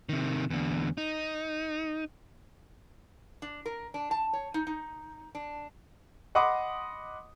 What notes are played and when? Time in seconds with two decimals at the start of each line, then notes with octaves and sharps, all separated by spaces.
0.09 C3 D#3
0.50 E2 D3
0.98 D#4
3.42 D4
3.66 A#4
3.94 D4
4.11 A5
4.33 C#5
4.54 D#4
4.67 D#4
5.35 D4
6.35 D#5 F#5 B5 C6 D6 D#6